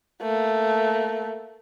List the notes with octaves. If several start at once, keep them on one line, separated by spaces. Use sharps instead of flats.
A3 A#3